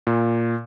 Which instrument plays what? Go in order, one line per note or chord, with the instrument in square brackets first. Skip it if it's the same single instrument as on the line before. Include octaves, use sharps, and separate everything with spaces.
[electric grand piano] A#2